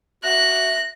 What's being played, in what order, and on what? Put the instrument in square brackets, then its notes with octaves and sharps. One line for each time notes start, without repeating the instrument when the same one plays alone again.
[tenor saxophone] F#4 [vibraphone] E5 [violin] F#6 [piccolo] A#6